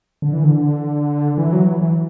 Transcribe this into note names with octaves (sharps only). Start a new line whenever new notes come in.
D3
E3
D3
E3
F#3
E3
E3